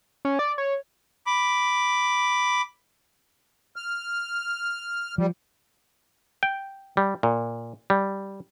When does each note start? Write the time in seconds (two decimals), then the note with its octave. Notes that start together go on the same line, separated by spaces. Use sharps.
0.25 C#4
0.39 D5
0.58 C#5
1.26 B5 D6
3.76 F6
5.18 F3 G3
6.43 G5
6.97 G3
7.23 A#2
7.90 G3